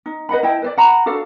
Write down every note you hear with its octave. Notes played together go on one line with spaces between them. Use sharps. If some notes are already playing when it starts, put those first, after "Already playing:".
D#4
B4 D#5 F#5 B5
E4 D#5 G5 A5
B4 C5 D5
F#5 A#5 B5
D4 F#4 A4 F5